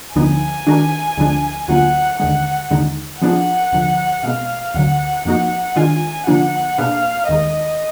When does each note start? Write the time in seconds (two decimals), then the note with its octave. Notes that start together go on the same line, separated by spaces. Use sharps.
0.15 D2 D3 F3 B3 D#4 G#5
0.67 D#3 G#3 D4 F#4 A#4
1.17 D2 D3 F3 G#3 D4
1.68 D2 D3 F#3 A#3 F4 F#5
2.19 D#2 D3 G#3 F#5
2.71 D#2 D3 G#3 D#4
3.21 F3 B3 D4 F4 G#4 F#5
3.72 D2 D3 F3
4.23 B2 G#3 B3 F5
4.74 D2 D3 F#3 F#5
5.25 F2 F3 A#3 D#4 F#4 F#5
5.76 D#3 G#3 D4 F4 G#5
6.27 D3 F3 A#3 D4 F4 F#5
6.78 B2 A#3 D4 G#4 B4 F5
7.29 D#2 D#3 G#3 D#5